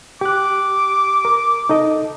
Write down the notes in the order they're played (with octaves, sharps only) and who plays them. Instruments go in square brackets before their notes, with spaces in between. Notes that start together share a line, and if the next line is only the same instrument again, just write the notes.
[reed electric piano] G4 F#6 [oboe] D6
[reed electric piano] A#4
D#4 A4 D#5